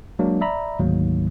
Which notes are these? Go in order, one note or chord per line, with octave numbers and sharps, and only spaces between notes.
F#3 G#3 A#3 D4
D5 E5 A#5 B5
D2 G#2 D#3 F#3 A#3